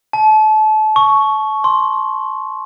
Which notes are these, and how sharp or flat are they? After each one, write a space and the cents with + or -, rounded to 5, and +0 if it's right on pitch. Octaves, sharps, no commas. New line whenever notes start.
A5 -30
C#6 +5
C6 +10